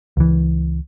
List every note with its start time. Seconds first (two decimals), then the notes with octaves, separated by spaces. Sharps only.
0.17 C#2 E3